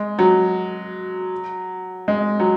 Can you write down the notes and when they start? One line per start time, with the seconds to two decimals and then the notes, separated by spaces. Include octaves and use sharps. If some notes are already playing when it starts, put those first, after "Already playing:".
Already playing: G#3
0.19 F#3
2.08 G#3
2.40 F#3